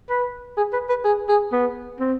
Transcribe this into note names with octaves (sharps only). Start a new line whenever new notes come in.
B4
G#4
B4
B4
G#4
G#4
B3
C4